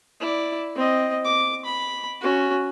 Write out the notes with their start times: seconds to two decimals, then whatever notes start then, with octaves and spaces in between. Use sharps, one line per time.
0.20 E4 D5
0.75 C4 D#5
1.25 D6
1.65 B5
2.21 C#4 F#4